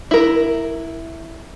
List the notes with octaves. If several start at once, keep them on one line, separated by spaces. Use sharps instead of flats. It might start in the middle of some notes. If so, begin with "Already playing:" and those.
E4 A#4